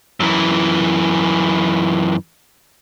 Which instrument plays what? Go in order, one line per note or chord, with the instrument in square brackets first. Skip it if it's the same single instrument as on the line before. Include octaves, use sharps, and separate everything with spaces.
[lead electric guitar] F#2 E3